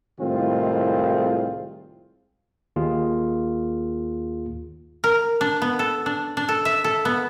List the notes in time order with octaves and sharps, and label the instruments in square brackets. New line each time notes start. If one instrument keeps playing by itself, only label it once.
[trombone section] C2 A2 D#3 G#3 C4 F4
[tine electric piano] D#2 F4 G#4
[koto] A#4
D4
B3
A4
D4
D4
A4
E5
A4
B3